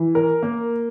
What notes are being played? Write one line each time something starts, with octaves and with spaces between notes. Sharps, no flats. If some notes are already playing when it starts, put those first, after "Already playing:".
Already playing: E3
A#4
A#3